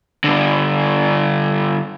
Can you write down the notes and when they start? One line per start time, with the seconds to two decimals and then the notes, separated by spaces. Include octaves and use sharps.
0.24 G2 D3